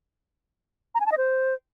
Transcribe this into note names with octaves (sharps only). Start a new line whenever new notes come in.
A#5
G#5
A5
D#5
C5